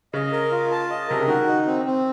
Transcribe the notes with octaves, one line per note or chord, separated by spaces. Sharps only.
C#3 D#5
A#4
F4
A5
D#5
C3 A#4
C#3
D#3 F#4
D#4
C4
C4